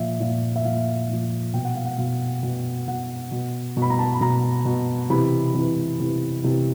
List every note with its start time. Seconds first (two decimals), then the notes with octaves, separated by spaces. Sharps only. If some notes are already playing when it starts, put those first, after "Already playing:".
Already playing: A#2 F3 E5
0.20 A#2 F3
0.56 E5
0.65 A#2 F3 F5
1.09 A#2 F3
1.54 B2 G5
1.64 F#5
1.76 F5
1.85 F#5
1.98 B2 F5
2.43 B2
2.88 B2 F#5
3.32 B2
3.77 B2
3.82 B5
3.90 A#5
3.99 A5
4.14 B5
4.21 B2 A#5
4.65 B2
5.10 C3 E3 B5
5.55 C3 E3
6.00 C3 E3
6.44 C3 E3